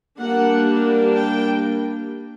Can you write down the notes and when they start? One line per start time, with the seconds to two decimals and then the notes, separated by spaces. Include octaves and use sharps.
0.20 G3 A#3 D4 F#5
1.14 G5